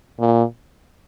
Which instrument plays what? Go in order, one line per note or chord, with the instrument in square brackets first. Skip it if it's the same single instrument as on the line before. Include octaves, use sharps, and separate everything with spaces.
[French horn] A#2